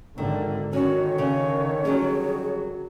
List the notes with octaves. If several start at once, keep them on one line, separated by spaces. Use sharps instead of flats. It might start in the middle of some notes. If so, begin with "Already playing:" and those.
G#1 D3 D#3
D3 D#3 C#4 F#4 C#5
C#3
F#3 G3 C#4 G#4